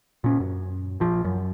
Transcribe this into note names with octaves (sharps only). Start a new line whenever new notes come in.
A#2 C#4
F#2
A#1 F3
F#2